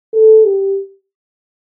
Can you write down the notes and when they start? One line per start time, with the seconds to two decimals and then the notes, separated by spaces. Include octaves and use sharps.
0.14 A4
0.45 G4